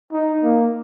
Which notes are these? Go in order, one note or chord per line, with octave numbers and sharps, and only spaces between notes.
D#4
A#3